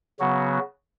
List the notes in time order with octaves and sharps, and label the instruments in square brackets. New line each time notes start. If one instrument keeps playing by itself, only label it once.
[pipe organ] C#3 F#3 B3 F#4